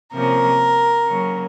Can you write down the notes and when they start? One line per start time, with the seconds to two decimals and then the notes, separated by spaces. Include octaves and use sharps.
0.13 C3 F3 A#3 C#4 A#4
1.07 C#3 F#3 A#3 C#4